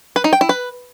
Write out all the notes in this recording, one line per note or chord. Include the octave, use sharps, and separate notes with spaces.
B4
D#4
G5
E4
B4